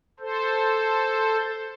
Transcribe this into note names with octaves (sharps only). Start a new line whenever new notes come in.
A4 C5